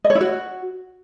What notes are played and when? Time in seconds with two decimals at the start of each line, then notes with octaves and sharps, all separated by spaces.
0.04 D#5
0.10 C#5
0.15 E4
0.21 F#4